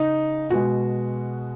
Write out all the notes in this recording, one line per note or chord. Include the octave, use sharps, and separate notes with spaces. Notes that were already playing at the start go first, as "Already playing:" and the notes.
Already playing: C#3 D#4
B2 G#3 F#4